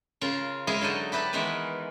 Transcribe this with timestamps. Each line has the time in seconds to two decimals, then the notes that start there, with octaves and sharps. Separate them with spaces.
0.21 C#3 F4 A#4
0.67 G#3 E4 G#4 A#4 D#5 F5
0.81 D3 F#3 D#4 D#5 A5
1.12 E4 G4 B4 A5
1.33 D#3 E3 G#3 B3 A#4 B4